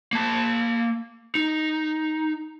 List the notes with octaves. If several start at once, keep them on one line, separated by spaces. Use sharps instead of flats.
A#3 A5
D#4